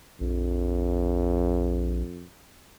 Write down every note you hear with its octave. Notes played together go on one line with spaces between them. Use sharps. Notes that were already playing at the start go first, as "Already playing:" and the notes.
A#1 F2